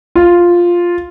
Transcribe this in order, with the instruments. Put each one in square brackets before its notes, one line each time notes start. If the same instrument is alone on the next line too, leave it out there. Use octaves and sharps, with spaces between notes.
[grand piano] F4